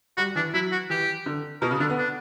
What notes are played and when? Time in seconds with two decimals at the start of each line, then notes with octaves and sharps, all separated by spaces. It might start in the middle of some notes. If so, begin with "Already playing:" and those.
0.17 G3 F#4
0.36 E3 D4
0.54 F#3 E4
0.72 F#4
0.90 E3 G4
1.26 D3
1.62 B2 A#4
1.71 C#3
1.80 D3 D4
1.90 B3
1.98 D4